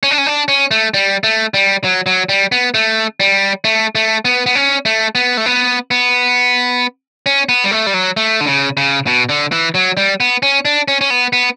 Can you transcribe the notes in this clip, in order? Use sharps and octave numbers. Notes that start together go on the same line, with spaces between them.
C#4
D4
C#4
D4
C#4
A3
G3
A3
G3
F#3
F#3
G3
B3
A3
G3
A3
A3
B3
B3
C#4
A3
B3
A3
B3
B3
C#4
B3
G3
A3
G3
F#3
A3
D3
C#3
C#3
B2
D3
E3
F#3
G3
B3
C#4
D4
C#4
C#4
B3
B3